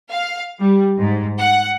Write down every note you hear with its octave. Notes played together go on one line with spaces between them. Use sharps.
F5
G3
G#2
F#5